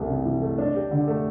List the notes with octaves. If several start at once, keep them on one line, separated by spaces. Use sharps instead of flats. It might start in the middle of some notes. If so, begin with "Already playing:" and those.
Already playing: C2 E3 A3
C3
E3
A3
D4
G4
D3
A3